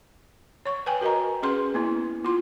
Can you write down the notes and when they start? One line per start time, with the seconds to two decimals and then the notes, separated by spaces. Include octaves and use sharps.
0.66 C#5 C#6
0.86 B4 G5 G#5
1.01 F#4 A#4 B4 D#5 A#5
1.43 C#4 G#4 B4 C6
1.74 A#3 B3 E4
2.25 F4 C6